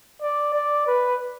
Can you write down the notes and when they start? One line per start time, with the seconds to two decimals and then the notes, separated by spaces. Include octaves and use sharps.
0.22 D5
0.54 D5
0.87 B4